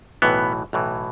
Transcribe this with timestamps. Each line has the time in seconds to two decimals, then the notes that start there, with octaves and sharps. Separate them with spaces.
0.22 B1 A2 E3 B3
0.73 B1 A2 E3